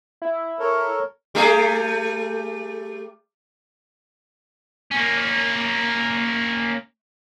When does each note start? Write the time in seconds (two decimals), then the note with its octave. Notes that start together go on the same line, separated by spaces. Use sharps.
0.22 E4
0.59 A4 A#4 C#5
1.35 G3 A3 G#4
4.91 A#3 C#4